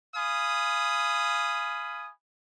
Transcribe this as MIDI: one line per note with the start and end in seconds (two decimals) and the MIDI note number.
0.15 2.10 77
0.15 2.10 80
0.15 2.10 83
0.15 2.10 87